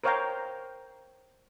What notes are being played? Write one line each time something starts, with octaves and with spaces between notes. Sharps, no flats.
A#4 C5 C#5 F5 G5 A#5